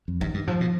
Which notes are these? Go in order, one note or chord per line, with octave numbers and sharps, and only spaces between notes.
F2
G2 D#3
G2
G#2 F3
B2